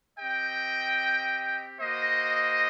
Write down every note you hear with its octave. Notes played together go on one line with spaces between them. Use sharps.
C4 G4 D#5 G5
A#3 F#4 C5 D#5